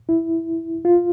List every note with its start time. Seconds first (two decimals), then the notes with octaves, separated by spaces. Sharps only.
0.09 E4
0.85 F4